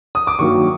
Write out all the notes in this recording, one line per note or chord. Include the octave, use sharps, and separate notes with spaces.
D#6
D6
G2 D#3 F#3 A#3 C#6